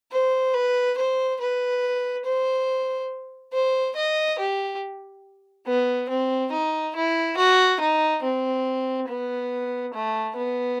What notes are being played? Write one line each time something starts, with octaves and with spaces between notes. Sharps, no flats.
C5
B4
C5
B4
C5
C5
D#5
G4
B3
C4
D#4
E4
F#4
D#4
C4
B3
A3
B3